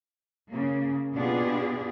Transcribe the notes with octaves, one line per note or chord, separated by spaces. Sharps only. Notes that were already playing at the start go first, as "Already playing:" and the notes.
C#3 A#3
B2 B3 D4 F4 G4 G#4